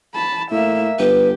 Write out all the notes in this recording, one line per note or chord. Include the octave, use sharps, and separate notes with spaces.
A5 B5
A2 A#3 E5
G1 G4 B4